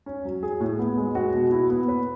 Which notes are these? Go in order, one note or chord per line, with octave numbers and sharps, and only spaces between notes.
C#4
F#3
G#4
A2
B3
G#3
F#4
B2
E4
B3
B4